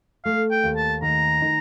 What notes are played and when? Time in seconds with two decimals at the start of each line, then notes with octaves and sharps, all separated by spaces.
0.25 A3 F5
0.51 G5
0.64 D#2
0.77 A5
1.02 D#3 A#5
1.42 D#4